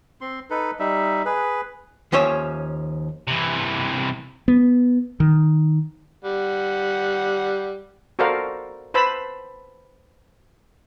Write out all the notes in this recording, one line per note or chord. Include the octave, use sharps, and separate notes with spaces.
C4 C6
D#4 A4 B4
G3 D#4 E5
G#4 B4
D#2 F3 C#4 C#5 E5
C3 E3
B3
D#3
G3 F#5
F#4 A4 A#4 C5 D5 F5
B4 C5 A5 B5 E6